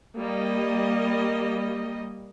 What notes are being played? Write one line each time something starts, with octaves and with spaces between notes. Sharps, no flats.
G3 A#3 D#5